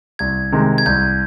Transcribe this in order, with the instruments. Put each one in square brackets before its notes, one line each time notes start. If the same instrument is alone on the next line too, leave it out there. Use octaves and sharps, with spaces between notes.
[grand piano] C2 [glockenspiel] G#6
[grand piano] C3 D#3 G#3
[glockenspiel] G#6
[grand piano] C2 [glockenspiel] G6